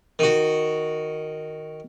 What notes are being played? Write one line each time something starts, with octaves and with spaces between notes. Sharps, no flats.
D#3 F#4